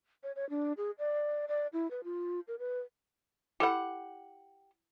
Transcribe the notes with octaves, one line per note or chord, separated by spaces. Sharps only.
C#5
C#5
D4
G#4
D5
D5
E4
B4
F4
A#4
B4
E4 G4 A4 F#5 B5